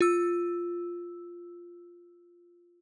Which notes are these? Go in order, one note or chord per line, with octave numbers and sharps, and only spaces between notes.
F4 E6